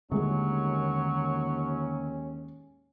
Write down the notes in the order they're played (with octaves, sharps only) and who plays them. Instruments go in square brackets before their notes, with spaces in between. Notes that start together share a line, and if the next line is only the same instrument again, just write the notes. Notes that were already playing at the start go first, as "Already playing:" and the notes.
[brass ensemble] D#2 C#4 [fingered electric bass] D3 A3 C4 [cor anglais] F#3 [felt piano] G#3 G#4